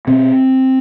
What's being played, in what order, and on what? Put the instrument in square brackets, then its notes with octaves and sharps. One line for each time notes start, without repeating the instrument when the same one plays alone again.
[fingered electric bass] B2 C4